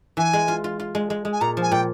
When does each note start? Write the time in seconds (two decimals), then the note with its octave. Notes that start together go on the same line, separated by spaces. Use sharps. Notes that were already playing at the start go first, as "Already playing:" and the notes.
0.17 E3 G#5
0.33 G#3
0.48 F4
0.64 F4
0.80 F4
0.95 G#3
1.10 G#3
1.25 G#3
1.32 G#5
1.41 A#2 A#5
1.57 F3 G#5
1.72 A#2 G5